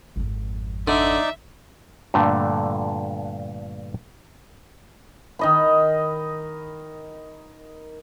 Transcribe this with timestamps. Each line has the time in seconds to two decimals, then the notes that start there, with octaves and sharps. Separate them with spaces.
0.16 G#1 F2
0.88 D3 D#4 D5 E5
2.14 G2 A#2 D3 A3
5.39 D#3 D#5 B5